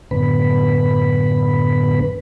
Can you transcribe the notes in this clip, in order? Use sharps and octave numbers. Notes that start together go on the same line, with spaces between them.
F#2 A2 D3 B3 B4 B5